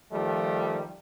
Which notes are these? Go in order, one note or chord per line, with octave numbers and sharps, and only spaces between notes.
D#3 F3 G3 A3